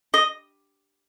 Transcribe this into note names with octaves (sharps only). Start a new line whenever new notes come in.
D#5